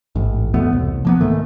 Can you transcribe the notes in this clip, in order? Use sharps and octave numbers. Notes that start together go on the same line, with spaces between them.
A1 G#2
E2 B2 A3 B3
C2
F3 A#3 B3
G#2 D#3 E3 A3